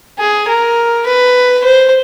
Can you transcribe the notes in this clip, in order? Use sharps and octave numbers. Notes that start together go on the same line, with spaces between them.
G#4
A#4
B4
C5